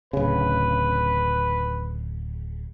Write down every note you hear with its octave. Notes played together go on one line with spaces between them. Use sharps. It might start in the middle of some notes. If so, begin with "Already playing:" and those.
D1 C#3 B4